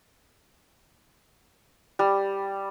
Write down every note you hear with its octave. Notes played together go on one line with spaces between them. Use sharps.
G3